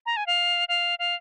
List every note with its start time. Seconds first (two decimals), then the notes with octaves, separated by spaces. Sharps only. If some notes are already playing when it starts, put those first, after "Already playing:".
0.06 A#5
0.17 G#5
0.27 F5
0.68 F5
0.99 F5